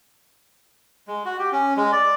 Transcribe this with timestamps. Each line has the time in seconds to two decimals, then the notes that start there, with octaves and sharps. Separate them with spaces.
1.08 G#3
1.25 F#4
1.39 G4
1.52 C#4
1.77 G#3
1.92 D5